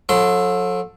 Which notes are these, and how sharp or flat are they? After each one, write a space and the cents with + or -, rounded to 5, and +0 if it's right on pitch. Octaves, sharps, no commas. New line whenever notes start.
F#3 -45 A4 +0 C6 -30